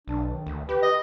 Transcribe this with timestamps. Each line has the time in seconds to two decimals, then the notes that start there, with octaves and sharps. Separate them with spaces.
0.08 B1 D4
0.31 D#3
0.47 D2
0.69 G4 B4
0.82 D#5